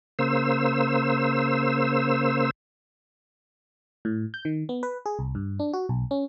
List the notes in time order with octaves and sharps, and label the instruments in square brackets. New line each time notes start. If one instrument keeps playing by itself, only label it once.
[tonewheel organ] C#3 A#3 C5 E6
[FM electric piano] A2
G6
D#3
B3
B4
G#4
C2
G2
D4
F#4
B1
C#4